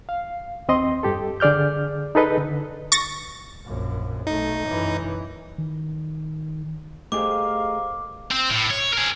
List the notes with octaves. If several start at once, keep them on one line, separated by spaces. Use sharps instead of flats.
F5
D#2 C4 D#5 C6
G2 G4 A4
D3 G#4 D5 F6 G6
D#4 G#4 A4 B4 D#5
D3
C#6 A6 A#6
A#1 F#2
B1 A3 D#4
F#2 E3
D#3
A3 G4 G#4 A#4 C5 D#5 F5 D6
C4
A2
C#5
G#4 A#4